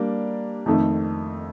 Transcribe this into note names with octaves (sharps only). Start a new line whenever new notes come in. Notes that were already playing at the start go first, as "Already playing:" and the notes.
Already playing: G3 A#3 D4
F2 D#3 A3